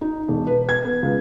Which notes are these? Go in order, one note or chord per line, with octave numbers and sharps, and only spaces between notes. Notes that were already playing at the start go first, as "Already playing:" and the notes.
D#4
E1
B4
G#6
B3
C#2